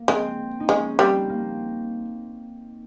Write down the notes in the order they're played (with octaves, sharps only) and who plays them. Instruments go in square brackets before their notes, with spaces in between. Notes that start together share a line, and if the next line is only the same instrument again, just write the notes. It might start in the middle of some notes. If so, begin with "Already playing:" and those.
Already playing: [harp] A#3
[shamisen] G#3 [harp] C4
[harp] D#4
[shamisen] G#3 [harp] C#4
[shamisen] G3 [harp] C4
[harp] A#3